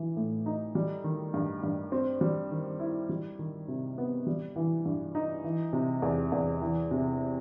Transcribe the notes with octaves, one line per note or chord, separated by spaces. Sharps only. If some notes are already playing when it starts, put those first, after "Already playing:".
Already playing: E3
A2
D#4
G3
D#3
G2
G2
C4
G3
D#3
E4
G3
D#3
C3
B3
G3
E3
G2
D#4
E3
C3
E2
E2
E3
C3